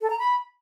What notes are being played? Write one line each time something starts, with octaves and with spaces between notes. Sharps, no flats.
A4
A#5
B5